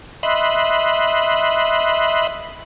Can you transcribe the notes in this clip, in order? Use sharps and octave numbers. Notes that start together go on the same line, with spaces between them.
D#5 E5 B5 C6 F#6